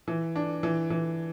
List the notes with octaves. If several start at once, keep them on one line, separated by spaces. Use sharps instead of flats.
E3
D4
E3
E3